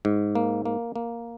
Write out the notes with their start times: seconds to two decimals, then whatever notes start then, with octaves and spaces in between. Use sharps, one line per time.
0.05 G#2
0.35 A#3
0.66 A#3
0.96 A#3